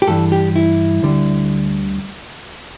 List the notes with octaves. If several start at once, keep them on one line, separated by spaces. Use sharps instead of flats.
G4
G2 E3 G3 A4
G4
E4
D2 D3 G3